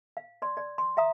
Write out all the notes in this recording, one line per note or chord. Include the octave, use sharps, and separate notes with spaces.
F5
D5 C6
D5
C6
E5 F5 A#5 D#6